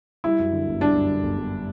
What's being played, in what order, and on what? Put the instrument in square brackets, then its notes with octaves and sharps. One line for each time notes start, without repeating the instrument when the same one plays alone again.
[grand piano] G3 [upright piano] E4
[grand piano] F#2
D3
G1
[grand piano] G3 [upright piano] D4
[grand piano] F#2
D3
G1
G3